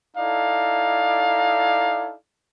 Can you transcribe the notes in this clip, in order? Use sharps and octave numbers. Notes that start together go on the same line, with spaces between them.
D#4 E4 A4 D5 F5